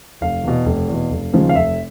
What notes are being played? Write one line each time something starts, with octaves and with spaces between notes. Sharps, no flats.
F1 F5
E2 B2
F1
E2 B2
F1
D#2 C#3 F3 G#3
F5
F1 E5